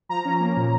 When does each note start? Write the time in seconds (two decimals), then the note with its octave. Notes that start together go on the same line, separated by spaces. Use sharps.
0.09 F3 A#5
0.25 C#4
0.40 A#3
0.57 A#2